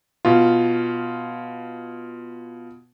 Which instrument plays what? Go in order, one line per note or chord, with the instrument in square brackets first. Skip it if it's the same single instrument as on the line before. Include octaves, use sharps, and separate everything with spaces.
[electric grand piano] B2 F4